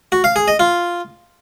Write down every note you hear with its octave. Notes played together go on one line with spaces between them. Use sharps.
F#4
F5
G#4
D#5
F4